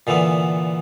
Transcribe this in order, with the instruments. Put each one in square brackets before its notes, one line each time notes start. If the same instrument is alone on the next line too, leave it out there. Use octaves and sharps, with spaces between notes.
[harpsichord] A#2 D3 E3 B3